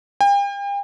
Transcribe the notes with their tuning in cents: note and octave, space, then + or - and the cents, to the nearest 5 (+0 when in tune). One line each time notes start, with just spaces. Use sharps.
G5 +40